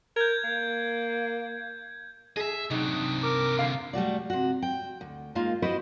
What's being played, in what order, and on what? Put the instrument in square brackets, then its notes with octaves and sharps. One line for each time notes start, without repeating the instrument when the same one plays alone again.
[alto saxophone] A#4 [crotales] G6 G#6
[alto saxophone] A#3
[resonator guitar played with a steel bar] G#4 [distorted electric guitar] D#5 E5
[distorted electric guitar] C3 D4 [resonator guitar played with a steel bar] F#3 D#4
[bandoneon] A#4 D6
[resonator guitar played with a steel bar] D3 F5
[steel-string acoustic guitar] G3 A3 F#4 D5
C3 F#4
G5
D2
G#3 A#3 D#4 F4
E4 F#4 B4 C5 D#5